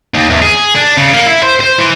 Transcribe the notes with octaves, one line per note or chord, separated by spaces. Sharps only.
D#2
E2
G#4
D4
C#3
A#3
E4
C5
C5
E3